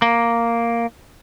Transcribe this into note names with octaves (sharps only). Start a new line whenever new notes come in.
A#3